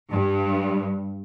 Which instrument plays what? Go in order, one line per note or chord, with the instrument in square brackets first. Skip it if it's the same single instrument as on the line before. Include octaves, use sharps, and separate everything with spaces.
[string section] G2